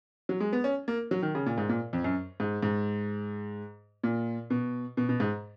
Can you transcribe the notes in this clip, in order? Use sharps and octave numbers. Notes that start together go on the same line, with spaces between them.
F#3
G#3
B3
C#4
A#3
F#3
D#3
C#3
A#2
G#2
A#2
F2
F#2
G#2
G#2
A#2
B2
B2
B2
G#2